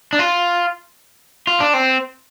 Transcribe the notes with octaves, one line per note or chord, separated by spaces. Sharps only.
D4
F4
F4
D4
C4